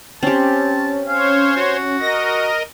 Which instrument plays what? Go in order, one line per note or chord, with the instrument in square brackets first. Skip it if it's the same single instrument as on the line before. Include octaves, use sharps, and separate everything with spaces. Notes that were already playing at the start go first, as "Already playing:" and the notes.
[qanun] C4 G4 [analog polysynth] C#4 [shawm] A5
[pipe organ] C5 C#5 [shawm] F5
[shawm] F#4
[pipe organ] A#4 D#5 [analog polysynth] A#6